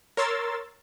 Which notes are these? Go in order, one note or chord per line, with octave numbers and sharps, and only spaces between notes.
A#4 C#5 C6 E6 A6